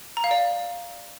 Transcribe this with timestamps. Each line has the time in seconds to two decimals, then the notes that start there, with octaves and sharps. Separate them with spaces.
0.17 A#5
0.24 F5
0.31 D5